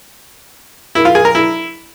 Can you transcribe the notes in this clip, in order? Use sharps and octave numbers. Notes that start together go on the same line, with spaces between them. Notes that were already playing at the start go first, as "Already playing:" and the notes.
E4
F4
G#4
A#4
E4